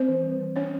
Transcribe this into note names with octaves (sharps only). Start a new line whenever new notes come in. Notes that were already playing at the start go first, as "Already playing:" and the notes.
Already playing: C4 C5
E3
G3
E3
C#4 C#5